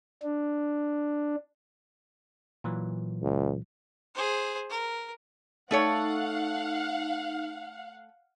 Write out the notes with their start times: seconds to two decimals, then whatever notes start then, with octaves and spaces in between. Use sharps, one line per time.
0.23 D4
2.64 A#2 E3 F#3
3.22 C#2
4.14 G#4 C5
4.70 A#4
5.71 A3 D#4 A4 C#5 F5 F#5